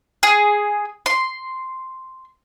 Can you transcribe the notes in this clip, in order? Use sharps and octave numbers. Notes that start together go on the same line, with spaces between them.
G#4
C6